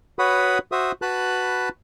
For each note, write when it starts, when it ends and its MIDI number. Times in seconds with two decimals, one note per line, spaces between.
0.19 0.58 66
0.19 0.58 71
0.19 0.58 73
0.19 0.58 78
0.19 0.58 83
0.19 0.58 87
0.72 0.92 66
0.72 0.92 72
0.72 0.92 76
0.72 0.92 87
1.02 1.69 66
1.02 1.69 71
1.02 1.69 81
1.02 1.69 83
1.02 1.69 90